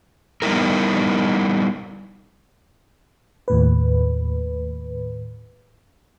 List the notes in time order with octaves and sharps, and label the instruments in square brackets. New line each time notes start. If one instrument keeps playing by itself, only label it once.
[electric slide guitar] G3 B3 D#4 E4 A#4
[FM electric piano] D#2 A2 B4